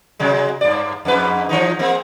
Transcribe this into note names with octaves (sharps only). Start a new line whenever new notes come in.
C3 F#3 G#3
G2 D5
F2 G#2 B4
E3 F3 D#4
G#3 A#3 C4